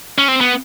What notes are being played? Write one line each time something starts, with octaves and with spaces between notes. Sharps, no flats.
C#4
C4
B3